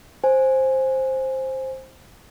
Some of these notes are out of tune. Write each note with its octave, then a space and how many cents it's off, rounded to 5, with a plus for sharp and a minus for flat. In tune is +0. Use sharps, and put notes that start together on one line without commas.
C5 +10 G#5 +0